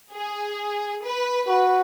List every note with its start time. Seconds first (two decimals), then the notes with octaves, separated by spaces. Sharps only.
0.13 G#4
1.04 B4
1.48 F#4 B4